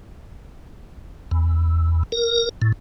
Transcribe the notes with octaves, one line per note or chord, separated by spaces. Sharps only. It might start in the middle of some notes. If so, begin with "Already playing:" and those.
E2
A#4
A2